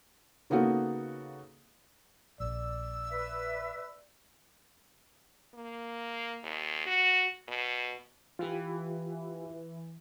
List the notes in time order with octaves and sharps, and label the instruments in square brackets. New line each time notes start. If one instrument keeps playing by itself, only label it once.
[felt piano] C#3 A#3 B3 D#4 F#4 A4
[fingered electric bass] A#1 [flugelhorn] D5 [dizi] E6
[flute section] B4 E5
[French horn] A#3
D#2
F#4
B2
[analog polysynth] E3 [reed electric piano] F4 G4